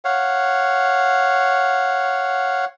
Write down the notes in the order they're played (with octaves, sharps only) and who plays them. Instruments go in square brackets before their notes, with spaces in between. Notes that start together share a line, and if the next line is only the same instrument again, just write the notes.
[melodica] C#5 F5 F#5